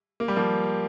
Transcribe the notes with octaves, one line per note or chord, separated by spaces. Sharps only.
A#3
G3
F3 A#3